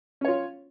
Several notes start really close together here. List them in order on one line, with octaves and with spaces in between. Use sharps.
C#4 C#5 F4